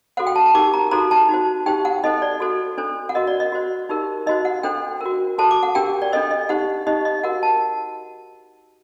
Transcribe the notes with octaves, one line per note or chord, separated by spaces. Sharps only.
F#4 A4 C5 F#5
G5
A5
A5
D#4 G4 A#4 D6
A#5
D#4 F#4 A4 C5 A#5
A5
D#4 F#4 C5
D#4 G4 C5 G5
F#5
D#4 A4 C5 D#5
D5
F#4 A4 C5
D4 A4 C5
F#5
F#4 A#4 D#5
D5
D#5
F#4 C5
D#4 G4 A#4
D#4 F#4 C5 D#5
F#5
D4 A4 C5 G5
A#4
F#4
F#4 A4 C5 A5
D6
F#5
D4 G4 A#4 G5
D5
D4 A4 C5 D#5
D#5
D#4 G4 C5 F#5
D#4 G4 C5 D#5
D#5
F#4 A#4 F#5
A5